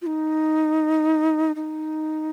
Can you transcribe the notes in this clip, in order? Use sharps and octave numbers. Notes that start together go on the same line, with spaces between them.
F4
D#4
D#4